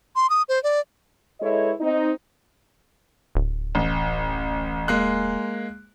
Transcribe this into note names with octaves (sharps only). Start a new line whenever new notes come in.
C6
D#6
C5
D5
G#3 E4 A4 B4 C#5 D#5
C4 D#4
D1
A1
G#3 A#3 F#6